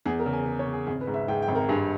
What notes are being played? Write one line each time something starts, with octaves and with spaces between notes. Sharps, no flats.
E2 G#4
A#4
C#3
G#5
C#3
C#5
C#3
G#4
G#1 G#4
B4
G#2
E5
G#2 G5
G5
G#1
A#4
G2 G#4